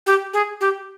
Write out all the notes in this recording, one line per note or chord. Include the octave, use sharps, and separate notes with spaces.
G4
G#4
G4